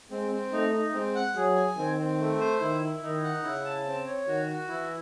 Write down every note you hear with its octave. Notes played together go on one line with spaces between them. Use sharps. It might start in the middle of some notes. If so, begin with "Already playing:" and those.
G#3 C4
C4
A3 D#4
D#4
G#3 C4
F#5
F#3 G#4
G#5
D#3 C4
C4
A3
C5
D#3 E4
E4
D#3 D#4
F#5
C#3 E4
A5
C4
C#5
D#3 F#4
F#4
E3 E4